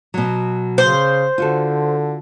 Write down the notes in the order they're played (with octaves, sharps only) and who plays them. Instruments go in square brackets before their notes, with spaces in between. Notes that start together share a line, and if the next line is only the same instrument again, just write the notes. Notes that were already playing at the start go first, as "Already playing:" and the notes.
[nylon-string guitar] B2 F#3
[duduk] C#3 [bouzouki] C5
[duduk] D3 [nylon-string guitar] F4 F#4 A4